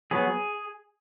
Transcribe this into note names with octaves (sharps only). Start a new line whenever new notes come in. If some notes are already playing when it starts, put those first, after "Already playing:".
F#3 B3 G#4